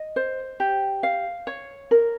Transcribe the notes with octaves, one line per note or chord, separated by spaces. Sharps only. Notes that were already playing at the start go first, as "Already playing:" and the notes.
Already playing: D#5
C5
G4
F5
C#5
A#4